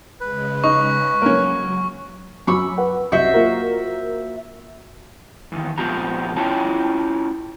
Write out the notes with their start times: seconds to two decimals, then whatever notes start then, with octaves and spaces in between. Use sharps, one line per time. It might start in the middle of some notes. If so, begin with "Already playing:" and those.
0.21 C#3 G#3 B4
0.64 D#4 C#6
1.22 F#3 A#3 C#4
2.47 F#2 F#3 B5 C#6 E6
2.78 B4 F#5
3.12 C2 F#2 F#4 C5 D#5 E5
3.34 A#3 F4 A#4
5.52 E2 D#3
5.78 A#2 F3 B3 F4 G4 A#5
6.36 C#4 E4 F4 C#5 G5 A5